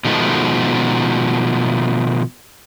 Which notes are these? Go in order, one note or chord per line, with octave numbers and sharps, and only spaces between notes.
B2 D#3 F3 G#3 A3